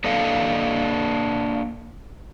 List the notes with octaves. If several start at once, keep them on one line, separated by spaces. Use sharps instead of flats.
A#3 D4 A4 D#5 F5